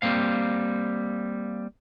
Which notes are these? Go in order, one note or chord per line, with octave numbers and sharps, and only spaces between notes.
G3 A#3 C4 F5